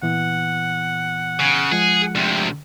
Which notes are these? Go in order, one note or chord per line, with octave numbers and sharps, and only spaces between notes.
A#2 E3 B3 F#5
C#3
F3 G#3 G#4
D2 C3